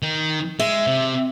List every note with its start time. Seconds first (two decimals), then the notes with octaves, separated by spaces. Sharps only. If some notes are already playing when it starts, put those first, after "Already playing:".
0.03 D#3
0.60 G#3 E5
0.86 C3